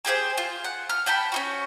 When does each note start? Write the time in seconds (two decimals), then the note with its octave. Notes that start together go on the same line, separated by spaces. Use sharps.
0.05 A#3 G4 G#4 C5
0.38 F4
0.64 F#5
0.89 F6
1.06 F#5 G5 A5 B5
1.32 C#4 D#4 F#4